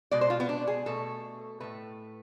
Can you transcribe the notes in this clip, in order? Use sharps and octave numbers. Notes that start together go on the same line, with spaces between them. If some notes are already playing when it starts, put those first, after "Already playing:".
B2 G#3 D5
C5
F4
B3
D4
G#4
B2 A3 A4
A2 E3 A3 B4